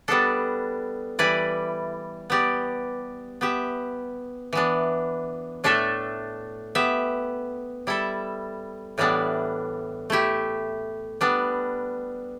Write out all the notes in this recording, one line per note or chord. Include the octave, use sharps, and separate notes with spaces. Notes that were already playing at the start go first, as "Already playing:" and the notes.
G3 B3 D4 A4
E3 G3 E4 B4 D5
B3 G4 D5
B3 G4 E5
E3 B3 D4
A2 A3 D4 A4 E5
B3 G4 E5
G3 E4 A4 E5
A2 E3 G3 B3 D4
A3 E4 G4
G3 B3 D4